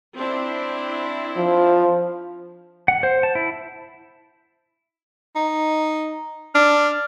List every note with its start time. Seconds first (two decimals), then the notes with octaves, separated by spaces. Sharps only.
0.16 C4 D4 E4
1.37 F3
2.88 F#5
3.03 C5
3.23 A5
3.35 E4
5.36 D#4
6.55 D4 F6